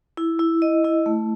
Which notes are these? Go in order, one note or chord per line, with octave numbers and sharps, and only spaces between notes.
E4
E4
D#5
E4
A3